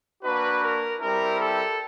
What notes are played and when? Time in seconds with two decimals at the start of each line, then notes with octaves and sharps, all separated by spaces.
0.24 A#3 D4 F#4 B4
0.62 A#4
1.00 G3 C4 E4 A#4
1.39 A4